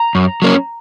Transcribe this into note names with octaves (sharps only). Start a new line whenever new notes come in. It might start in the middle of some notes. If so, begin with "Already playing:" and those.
Already playing: A#5
F#2
F#3 A#3 C#4